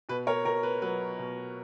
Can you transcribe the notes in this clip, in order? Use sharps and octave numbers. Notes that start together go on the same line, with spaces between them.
B2 B4
A#4 C#5
B2 A#4
B4
F#3 B4
B2